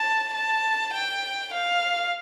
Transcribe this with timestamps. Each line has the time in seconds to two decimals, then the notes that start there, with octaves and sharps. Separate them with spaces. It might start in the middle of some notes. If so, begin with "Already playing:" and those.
Already playing: A5
0.34 A5
0.94 G5
1.54 F5